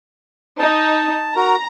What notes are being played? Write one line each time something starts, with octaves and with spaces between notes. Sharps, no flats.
D#4 A5
F#4 A#4 A#5